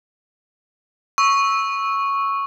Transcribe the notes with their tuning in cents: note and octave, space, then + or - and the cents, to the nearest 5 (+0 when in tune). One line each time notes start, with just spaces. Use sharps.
C#6 +0 E6 -10